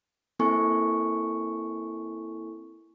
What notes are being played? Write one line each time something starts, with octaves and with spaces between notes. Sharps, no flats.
A#3 C4 E4 A4 G#5 C#6